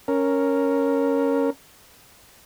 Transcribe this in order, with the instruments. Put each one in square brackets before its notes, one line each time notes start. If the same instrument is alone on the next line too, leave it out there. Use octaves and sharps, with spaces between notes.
[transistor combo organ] C#4 A#4